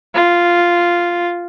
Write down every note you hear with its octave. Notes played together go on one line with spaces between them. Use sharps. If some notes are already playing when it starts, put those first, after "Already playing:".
F4